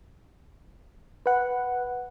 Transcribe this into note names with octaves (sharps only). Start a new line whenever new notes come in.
B4 F#5